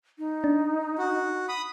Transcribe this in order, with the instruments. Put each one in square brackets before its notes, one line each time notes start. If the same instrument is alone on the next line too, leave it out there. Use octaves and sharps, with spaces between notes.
[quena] D#4
[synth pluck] D4
[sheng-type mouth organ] F#4
B5 D#6